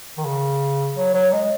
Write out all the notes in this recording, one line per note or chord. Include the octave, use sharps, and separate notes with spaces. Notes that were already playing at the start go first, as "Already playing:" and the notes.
D#3
C#3
F#3
F#3
G#3